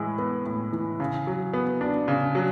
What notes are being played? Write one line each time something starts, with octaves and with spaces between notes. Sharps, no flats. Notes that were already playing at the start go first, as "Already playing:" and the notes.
Already playing: A2 E3 G#3
B3
A2
E3
C#3
F#3
B3
D4
C#3
F#3